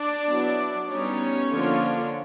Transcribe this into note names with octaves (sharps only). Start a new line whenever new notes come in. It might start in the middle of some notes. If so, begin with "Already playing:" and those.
Already playing: D4 D5
F#3 B3 E4
G3 B3 C#4 D#4 C#5
D3 F3 A#3 D4 F4